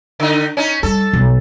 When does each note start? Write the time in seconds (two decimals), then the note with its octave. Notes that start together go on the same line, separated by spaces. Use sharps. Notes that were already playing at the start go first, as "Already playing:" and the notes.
0.20 D3 D#4
0.57 C#4 D#4
0.83 G3 A4
1.13 B1